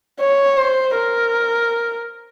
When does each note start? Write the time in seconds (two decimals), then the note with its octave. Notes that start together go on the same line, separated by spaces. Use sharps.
0.20 C#5
0.57 C5
0.95 A#4